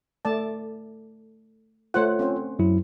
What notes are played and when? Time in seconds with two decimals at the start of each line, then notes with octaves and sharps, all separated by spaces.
0.25 A3 D5 A5
1.94 A3 F4 C5 C#5 F#5
2.19 C4 C#4 C5
2.59 F#2 F#3 E4